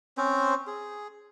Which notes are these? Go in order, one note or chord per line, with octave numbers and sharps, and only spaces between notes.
C4 C#4 C5
G#4